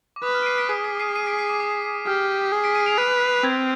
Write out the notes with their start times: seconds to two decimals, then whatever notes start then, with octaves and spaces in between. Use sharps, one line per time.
0.16 D6
0.23 B4 D#6
0.34 F6
0.43 D7
0.46 C7 D#7
0.58 B6 D7
0.69 G#4 C7 D#7
0.84 B6 D7
0.99 C7 D#7
1.15 C7 D#7
1.27 B6 D7
1.39 C7
1.50 D6
1.60 D#6
2.07 G4 F6
2.52 G#4
2.64 B6 D7
2.75 C7 D#7
2.86 D7 F7
2.98 B4 C7 D#7
3.44 C4 G#6